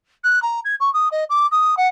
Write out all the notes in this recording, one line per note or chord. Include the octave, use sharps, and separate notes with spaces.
F#6
A#5
G#6
C#6
D#6
D#5
D6
D#6
F#5